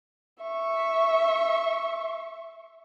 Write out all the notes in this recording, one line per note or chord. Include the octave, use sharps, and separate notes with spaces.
E5 C#6